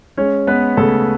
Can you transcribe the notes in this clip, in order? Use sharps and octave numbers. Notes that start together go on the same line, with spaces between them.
G#3 C#4 C#5
G#3 B3 B4
C#3 A3 A4